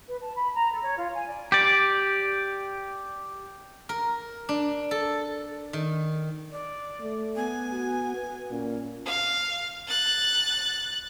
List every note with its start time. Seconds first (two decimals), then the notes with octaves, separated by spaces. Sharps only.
0.09 B4
0.21 A5
0.36 B5
0.53 A#5
0.72 A4
0.83 C#5
0.97 F4
1.14 G#5
1.27 D5
1.52 G4 D5
3.89 A#4
4.49 D4
4.91 A4
5.73 D#3
6.52 D5
7.01 A3
7.36 B3 G#5
7.72 F#4
8.15 B4
8.51 A#2 C#4
9.06 F5
9.87 F#6 A6